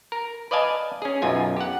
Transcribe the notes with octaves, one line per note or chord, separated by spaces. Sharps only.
A#4
B4 D5 D#5 F5 G#5 A5
C#4 G#4
B1 F#2 F4 G#5
G4 F#5